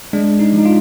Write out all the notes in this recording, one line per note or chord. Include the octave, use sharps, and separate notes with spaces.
G#3 D4
D#4
F3
D#4
F4